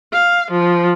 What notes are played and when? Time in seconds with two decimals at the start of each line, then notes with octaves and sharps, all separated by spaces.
0.13 F5
0.49 F3